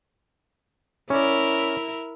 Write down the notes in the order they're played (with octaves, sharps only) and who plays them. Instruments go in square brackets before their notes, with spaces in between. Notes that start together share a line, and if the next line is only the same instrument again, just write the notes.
[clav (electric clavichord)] C#4 D5 [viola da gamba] E4 A#4